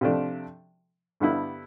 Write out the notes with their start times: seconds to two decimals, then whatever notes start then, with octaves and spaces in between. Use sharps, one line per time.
0.01 C3 F3 A3 D4
1.20 G2 D3 G3 B3 E4